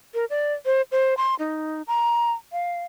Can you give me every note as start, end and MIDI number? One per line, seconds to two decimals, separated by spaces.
0.14 0.25 70
0.30 0.53 74
0.66 0.82 72
0.92 1.17 72
1.17 1.35 84
1.39 1.82 63
1.87 2.31 82
2.52 2.84 77